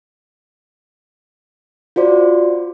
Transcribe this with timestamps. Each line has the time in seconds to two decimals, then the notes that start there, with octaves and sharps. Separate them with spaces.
1.96 F4 F#4 C5 D5